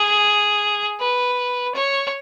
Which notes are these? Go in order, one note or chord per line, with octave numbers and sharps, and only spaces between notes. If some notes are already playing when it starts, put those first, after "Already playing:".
Already playing: G#4
B4
C#5